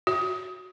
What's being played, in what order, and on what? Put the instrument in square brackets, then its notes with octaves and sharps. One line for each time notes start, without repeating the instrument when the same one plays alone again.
[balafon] F#4